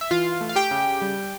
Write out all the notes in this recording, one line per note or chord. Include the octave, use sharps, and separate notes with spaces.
E5
E3 F4 F5
A3
F5
G4 G5
C#3
G3